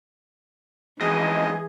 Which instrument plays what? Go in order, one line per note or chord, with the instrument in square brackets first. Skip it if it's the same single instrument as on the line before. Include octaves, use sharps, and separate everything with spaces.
[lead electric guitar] F2 G#2 [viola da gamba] E3 [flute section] G#4 [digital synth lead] D#5